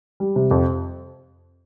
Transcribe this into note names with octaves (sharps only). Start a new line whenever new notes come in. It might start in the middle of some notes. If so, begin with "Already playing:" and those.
G3
C3
F2